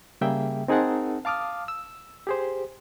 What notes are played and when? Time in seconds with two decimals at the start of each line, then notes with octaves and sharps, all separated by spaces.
0.21 C#3 G3 A#3 G#4 E5 G5
0.68 C4 D#4 G#4 A#4 F#5 A5
1.25 F5 A5 D6 D#6 F6
1.68 E6
2.27 G4 G#4 C5